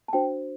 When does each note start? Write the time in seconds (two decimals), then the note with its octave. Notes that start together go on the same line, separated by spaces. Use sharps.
0.08 A5
0.13 D4 F#4 C5 G5